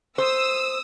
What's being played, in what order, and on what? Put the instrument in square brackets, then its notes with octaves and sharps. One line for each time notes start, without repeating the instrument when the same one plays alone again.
[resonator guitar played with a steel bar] C5 [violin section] D#6 E6